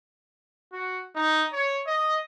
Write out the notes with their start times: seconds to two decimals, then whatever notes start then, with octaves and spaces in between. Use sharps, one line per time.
0.73 F#4
1.15 D#4
1.53 C#5
1.87 D#5